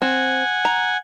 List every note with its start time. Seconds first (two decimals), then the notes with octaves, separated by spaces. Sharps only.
0.02 C4 F#5 G#5
0.65 A#5